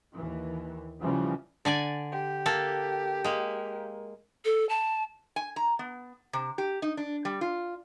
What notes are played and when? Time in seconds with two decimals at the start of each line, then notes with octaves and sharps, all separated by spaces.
0.14 D#2 E3
1.00 C#3 E3 F3 G3
1.65 D3 D5 G#5
2.12 G4
2.46 A#3 A4
3.24 G#3 A#3
4.45 A4
4.69 A5
5.36 G#5
5.56 A#5
5.79 B3
6.33 C3
6.58 G4
6.82 D#4
6.97 D4
7.25 G3
7.41 F4